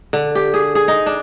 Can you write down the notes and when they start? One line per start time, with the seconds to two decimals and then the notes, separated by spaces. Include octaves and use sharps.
0.13 D3
0.35 G4
0.54 G#4
0.75 G#4
0.88 D#4
1.06 D4